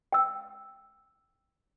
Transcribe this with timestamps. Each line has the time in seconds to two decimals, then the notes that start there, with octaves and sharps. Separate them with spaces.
0.13 G5 E6